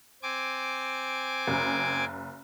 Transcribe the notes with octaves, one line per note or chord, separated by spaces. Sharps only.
C4 G#5 D6
F#1